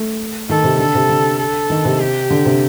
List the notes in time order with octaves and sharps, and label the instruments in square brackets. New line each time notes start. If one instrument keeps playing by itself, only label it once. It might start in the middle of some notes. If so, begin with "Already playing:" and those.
Already playing: [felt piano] A3
[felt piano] D#3 [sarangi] A4
[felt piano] C3
[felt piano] D3 [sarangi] A4
[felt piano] C3
D3
[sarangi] A4
[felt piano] D#3
C3
[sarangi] G4
[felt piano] D3
C3